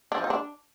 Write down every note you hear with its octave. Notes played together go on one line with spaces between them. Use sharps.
D4
F3
D#4
D4